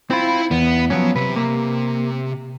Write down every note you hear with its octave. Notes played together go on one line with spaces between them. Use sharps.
C4 E4 F4 B5
E2 B3
F3 F#3 B3 C#4
C3 B4
A#3